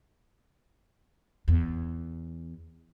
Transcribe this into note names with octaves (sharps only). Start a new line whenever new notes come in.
E2